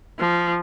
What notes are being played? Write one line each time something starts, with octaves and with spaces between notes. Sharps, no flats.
F3